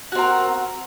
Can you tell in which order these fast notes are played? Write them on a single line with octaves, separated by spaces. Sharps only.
F#4 C4 A#4